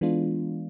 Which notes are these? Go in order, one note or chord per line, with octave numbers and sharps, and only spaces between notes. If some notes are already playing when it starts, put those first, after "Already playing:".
E3 G#3 B3 D4 F4